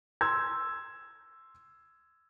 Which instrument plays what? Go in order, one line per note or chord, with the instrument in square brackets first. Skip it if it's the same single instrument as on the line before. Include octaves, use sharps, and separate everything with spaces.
[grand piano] C6 E6 G#6